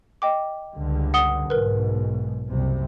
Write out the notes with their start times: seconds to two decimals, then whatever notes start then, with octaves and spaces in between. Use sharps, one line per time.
0.22 D#5 G5 D6
0.75 C#2 G2 D3
1.14 F#5 D#6 G7
1.50 B1 G#2 A#4 B4
2.50 F#1 C2 C3